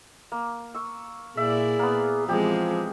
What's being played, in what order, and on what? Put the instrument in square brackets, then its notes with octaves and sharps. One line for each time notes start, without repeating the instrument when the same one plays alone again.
[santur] A#3
C#6 E6
[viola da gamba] A#2 E4 D5 [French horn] G#4 [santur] E5
[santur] A#3 B3
[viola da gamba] E3 G#3 C4 [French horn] F3 [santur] G4 G#4